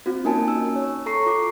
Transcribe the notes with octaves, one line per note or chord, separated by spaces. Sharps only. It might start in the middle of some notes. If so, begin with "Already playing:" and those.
C4 F4 F#4
A#3 C#4 D#4 A#4 G#5 A5
E6
C#5
A4 A#5 C#6 C7
F4 D6